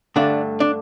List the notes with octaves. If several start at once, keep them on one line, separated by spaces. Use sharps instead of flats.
G2 D3 A3 D4
D4